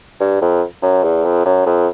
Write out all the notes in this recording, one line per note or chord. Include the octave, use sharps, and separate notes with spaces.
G2
F2
F#2
E2
F2
F#2
F2